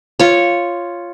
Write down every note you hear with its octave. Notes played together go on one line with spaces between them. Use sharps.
F4 C#5